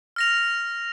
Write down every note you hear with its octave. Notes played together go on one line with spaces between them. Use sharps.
F6 A#6 F7